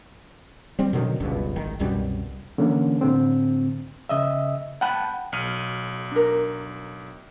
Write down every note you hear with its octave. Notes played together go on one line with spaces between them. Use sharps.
G3 C4
B2 D3 D#3 F#3
F#1 C#2 G2 B2
G#1 D#3
C2 F#2 B2 G3
D3 E3 A#3 C#4 D4
A2 D3 C4
C#3 D#5 E5
F#5 G5 A5 B5 F#6
B1 F6 D#7
D4 A#4